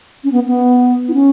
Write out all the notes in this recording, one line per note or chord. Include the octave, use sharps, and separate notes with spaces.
C#4
B3
B3
E4
C#4